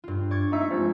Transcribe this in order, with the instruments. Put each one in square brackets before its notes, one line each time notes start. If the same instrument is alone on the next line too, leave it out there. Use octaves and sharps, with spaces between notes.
[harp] G2 F4
D5 C#6 G#6
[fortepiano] D#4 E5
G#2 F3 C4